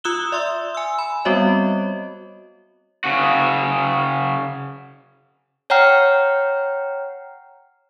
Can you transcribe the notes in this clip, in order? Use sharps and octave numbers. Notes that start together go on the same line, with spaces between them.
F4 D#6 E6 F#6 E7 G7
D5 E5 C6 E6
G#5 E6
B5
G3 B3 C4 F#4 C#5 D#5
C#3 F#4
C#5 F#5 G5 A#5 F6 C7